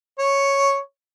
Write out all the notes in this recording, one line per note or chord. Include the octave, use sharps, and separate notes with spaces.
C#5